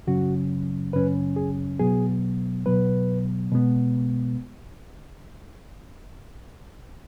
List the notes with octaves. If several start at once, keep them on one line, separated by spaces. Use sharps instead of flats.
F#2 C#3 F#3 C#4 F#4
F#2 C#3 F#3 C#4 B4
G#4
B2 F#3 B3 G#4
B2 F#3 B3 B4
B2 G#3 B3